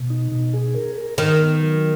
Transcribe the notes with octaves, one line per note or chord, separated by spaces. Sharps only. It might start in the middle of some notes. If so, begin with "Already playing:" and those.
Already playing: B2
D#4
B2
G#4
A#4
A#4
D#3 A#4
B3
F#3